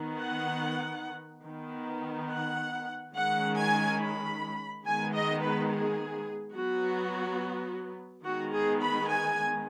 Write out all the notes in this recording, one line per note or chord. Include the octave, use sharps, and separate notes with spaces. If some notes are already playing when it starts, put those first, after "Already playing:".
Already playing: D#3 B3
F#5
D#3 B3
F#5
D#3 G#3 C#4 F#5
G#5
B5
D#3 G#3 B3 G#5
D#5
B4
G#4
F#3 B3 F#4
D#3 G#3 B3 F#4
G#4
B5
G#5